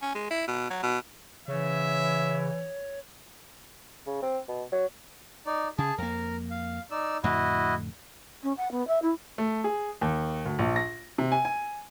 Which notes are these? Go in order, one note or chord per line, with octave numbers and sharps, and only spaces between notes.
C#4
G#3
E4
B2
F#3
B2
C#3 E3 C#5 E5
C#3
C4
B2
F#3
D#4 D5
C#3 G#4 A5
F2 A#3 A#4
F5
D#4 D5 E6
F2 A2 D3 E4 F#4 D#5
C#4
F#5
B3
E5
E4
A3
G#4
D#2
D2
A#1
A#6
C3
G#5
G#5